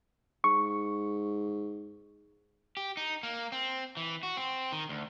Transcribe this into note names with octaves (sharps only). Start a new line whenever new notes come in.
G#2 C#6
G4
D#4
A#3
C4
E3
F#4
C4
D#3
D2